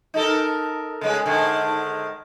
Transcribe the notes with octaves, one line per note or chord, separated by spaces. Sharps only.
D#4 A4 A#4
C#3 G#3 B4
G#2 D3 D#3